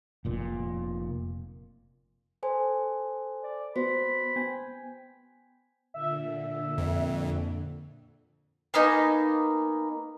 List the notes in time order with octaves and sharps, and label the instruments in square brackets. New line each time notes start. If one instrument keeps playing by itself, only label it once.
[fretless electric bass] F1 A#2
[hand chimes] A4 C5 G#5
[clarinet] D5
[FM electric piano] B3 F#4 [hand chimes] C5 [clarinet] B5
[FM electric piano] B3 G5 G#5
[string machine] A#2 D3 [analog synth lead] E5
[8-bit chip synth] F2
[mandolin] A#3 B3 D#4 G#5